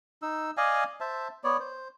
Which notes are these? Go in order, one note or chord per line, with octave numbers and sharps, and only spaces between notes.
D#4 E6
D5 D#5 F5 G#5
C5 E5 A5
B3 C#5 D5
C5